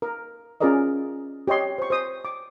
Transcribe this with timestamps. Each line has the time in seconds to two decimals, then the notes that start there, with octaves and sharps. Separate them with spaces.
0.02 A#4
0.60 C#4 F4 G#4 A#4 D5 D#5
1.47 G4 C#5 D#5 C6
1.78 C5 C#6
1.90 C5 D#6
2.25 D6